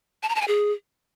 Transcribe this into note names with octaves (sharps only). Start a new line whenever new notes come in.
A5
A#5
A5
G#5
G#4